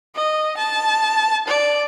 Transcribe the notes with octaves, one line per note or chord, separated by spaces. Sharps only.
D#5
A5
D5